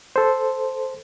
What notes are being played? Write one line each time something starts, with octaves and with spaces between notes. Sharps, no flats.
A4 C5